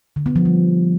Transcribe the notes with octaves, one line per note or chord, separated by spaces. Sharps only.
D3
B3
F3
G3